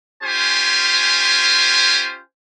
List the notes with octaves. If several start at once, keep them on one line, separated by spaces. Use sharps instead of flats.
C#4 F4 G4 C5 G#5